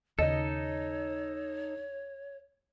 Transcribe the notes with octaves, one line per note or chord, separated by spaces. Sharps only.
D#2 C#3 D#4 A4 C#5 D#5